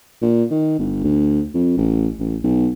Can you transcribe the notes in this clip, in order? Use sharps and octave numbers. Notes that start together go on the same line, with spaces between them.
A#2
D#3
G1
D2
F2
A1
A1
B1